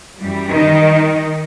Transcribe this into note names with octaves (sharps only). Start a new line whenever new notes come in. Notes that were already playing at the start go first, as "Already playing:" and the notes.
F#2 E3 G3
D#3 D#4